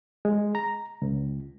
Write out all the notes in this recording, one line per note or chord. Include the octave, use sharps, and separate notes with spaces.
G#3
A#5
C#2